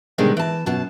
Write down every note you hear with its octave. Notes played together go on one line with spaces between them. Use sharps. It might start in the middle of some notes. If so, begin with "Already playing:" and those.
B2 D3 D#3 G3 G#3 C4
E3 A5
F#2 B2 A5